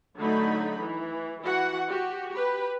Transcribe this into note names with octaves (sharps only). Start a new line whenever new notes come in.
D3 F#3 A3 D#4 B5
E3
E3 F#4 F#5
F#4 G4
G4 B4